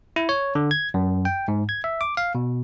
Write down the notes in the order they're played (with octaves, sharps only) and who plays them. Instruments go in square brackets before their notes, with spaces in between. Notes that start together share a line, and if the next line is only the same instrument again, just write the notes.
[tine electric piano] E4
C#5
D3
G#6
F#2
G5
G#2
G#6
E5
D6
F5
B2